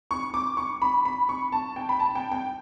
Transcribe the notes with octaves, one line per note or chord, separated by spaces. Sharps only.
C#6
D6
C#6
B5
B5
C#6
A5
G5
B5
A5
G5
G5